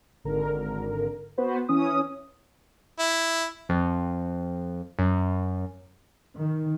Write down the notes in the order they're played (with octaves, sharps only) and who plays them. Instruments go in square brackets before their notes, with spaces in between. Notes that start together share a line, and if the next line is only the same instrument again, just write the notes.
[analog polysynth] G#1 D3 A#4
B3 F#4 B4 C5
E3 C#4 D#6
[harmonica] E4
[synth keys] F2
F#2
[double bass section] D#3